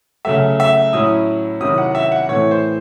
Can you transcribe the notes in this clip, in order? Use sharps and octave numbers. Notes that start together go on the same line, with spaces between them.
C#3 F#3 A3 E5
E5
A2 F#3 C#4 E4 D#6
C3 D#3 F#3 C#4 E4 D#6
F#5
E5
F#5
A2 E3 A3 C4 C#5
C5